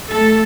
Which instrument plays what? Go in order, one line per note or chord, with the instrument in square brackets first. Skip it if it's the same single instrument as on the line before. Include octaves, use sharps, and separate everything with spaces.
[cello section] A3 A4